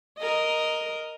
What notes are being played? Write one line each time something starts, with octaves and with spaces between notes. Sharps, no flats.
A#4 D#5